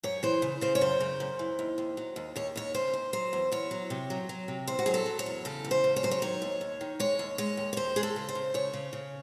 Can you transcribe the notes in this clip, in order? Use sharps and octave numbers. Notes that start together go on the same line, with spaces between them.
F#2 C#5
E3 C5
C#3
C#3 C5
C#5
F#2 C5
C#3
F#2
E3
D#2
D#2
F#3
D#2
D#2 C#5
D#2 C#5
C#3 C5
D#2
F#3 C5
E2
E2 C#5
F#3
C3
F#3
F#3
C3
E2 C5
F#4
F#3 G#4
A4
F#3
C#5
E2
C#3 A4
E2
C5
C#3
C#5
F#3 C5
C#5
D#3 C#5
D#2
D#2
D#3
G#3 C#5
D#2
G#3 C#5
D#2
C#5
D#2 C5
G#3 G#4
A4
C#3
C5
C#3
C#3 C#5
C#3
C#3